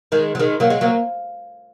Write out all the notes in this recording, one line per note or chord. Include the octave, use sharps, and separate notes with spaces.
D#3 G#3
F#3
D#3 G#3
F#3 A#3
G#3
F#3 A#3